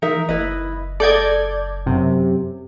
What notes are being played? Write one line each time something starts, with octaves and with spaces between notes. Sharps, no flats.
E3 D#4 A#4 E5
F#1 E4 B4 D#5
A4 D5 D#5 G6 G#6
F#2 C3